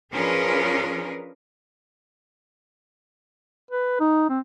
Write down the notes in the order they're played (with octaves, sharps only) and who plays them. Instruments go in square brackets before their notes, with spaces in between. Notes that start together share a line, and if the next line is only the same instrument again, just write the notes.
[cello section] F3 C#4 D4 G#4 A#4 B4
[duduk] B4
D#4
C4